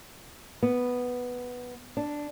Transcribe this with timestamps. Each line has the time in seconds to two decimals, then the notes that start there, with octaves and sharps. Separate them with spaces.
0.63 B3
1.97 D4